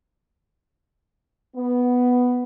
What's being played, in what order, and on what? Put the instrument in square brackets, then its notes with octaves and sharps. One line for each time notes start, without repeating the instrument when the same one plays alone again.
[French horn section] B3